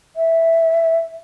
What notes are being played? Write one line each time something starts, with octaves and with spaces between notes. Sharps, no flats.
E5